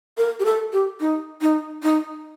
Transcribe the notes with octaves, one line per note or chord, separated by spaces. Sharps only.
A#4
G4
A4
G4
D#4
D#4
D#4